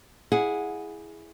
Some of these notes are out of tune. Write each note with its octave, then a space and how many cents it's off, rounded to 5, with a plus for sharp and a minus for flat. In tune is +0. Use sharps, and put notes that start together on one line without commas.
E4 +0 G#4 +0 F#5 -15